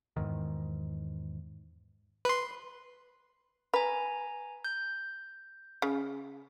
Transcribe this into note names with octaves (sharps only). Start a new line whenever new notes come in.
E2 G#2 D#3
B4 C6
B4 G#5 A#5
G6
C#3